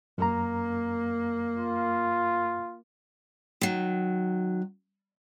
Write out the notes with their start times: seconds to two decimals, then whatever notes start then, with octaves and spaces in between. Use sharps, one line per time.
0.18 F#2 A#3 A#5
1.57 F4
3.61 D#3 F#3